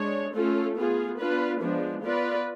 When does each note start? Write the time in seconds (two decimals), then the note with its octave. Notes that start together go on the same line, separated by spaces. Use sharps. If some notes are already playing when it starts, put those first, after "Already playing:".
Already playing: G#3 D4 C#5
0.33 A3 C#4 F4 A4
0.76 B3 F4 G#4
1.18 B3 D4 F4 B4
1.60 F3 G#3 B3 D4
2.02 B3 F4 B4 D5